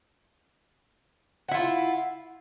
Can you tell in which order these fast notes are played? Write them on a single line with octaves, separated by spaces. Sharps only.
F#5 E4 F4